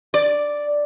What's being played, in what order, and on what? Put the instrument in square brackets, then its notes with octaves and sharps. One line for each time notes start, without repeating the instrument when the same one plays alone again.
[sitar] D5